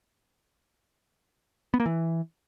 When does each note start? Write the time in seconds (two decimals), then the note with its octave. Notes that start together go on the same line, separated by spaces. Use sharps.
1.74 B3
1.80 A#3
1.86 E3